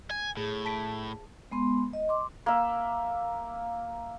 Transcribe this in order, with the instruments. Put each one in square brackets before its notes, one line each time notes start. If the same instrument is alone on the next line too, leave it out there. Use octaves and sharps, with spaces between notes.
[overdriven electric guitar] G#5
[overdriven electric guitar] A2 [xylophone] G#4
[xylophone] A5 B6 D7
[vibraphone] G#3 B3 C6
D#5
C6 D6
[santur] A#3 E5